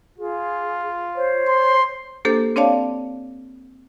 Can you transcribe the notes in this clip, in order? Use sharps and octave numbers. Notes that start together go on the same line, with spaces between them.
F4 G#4
C5 C#5
C6
A#3 D4 G4 A4 C5
C4 D4 C#5 D5 F5 A5